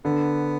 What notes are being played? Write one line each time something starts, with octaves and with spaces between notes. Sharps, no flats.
D3 B3